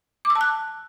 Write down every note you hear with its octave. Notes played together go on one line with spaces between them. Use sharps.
D6
E6
A5
F#6